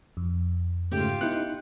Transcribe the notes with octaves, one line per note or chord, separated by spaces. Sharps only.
F2
G#2 C#3 A3 F4 G4
B3 D#4 E4 F#6 C#7